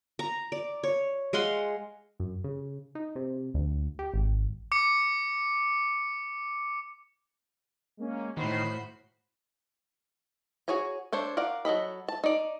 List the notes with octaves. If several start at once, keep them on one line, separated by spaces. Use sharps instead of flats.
A#5
D5
C#5
G#3 F5 F#5 C6
F#2
C#3
D#4
C3
D2
G4
G#1
D6 C#7
G#3 A#3 C#4
A2 D#3 F#4 C5 B5 C7
F#4 G#4 C#5 G#5 A#5
D4 A4 C5 C#5
A#4 D5 F5 F#5
F#3 A4 D#5 B5
A5
D#4 D5